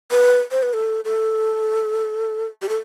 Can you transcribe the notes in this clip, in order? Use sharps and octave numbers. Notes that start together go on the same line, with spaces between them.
B4
C5
B4
A4
A4
G4
A4